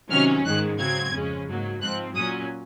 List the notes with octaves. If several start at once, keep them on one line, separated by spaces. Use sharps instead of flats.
C3 D#3 F#3 C#4 F6
G#2 D#3 G#3 F#6
C#3 F#3 C4 G#6
F2 C#3 G#3 C#4
G#2 F#3 A#3
G#2 F3 C4 F#6
A#2 F#3 C#4 D#6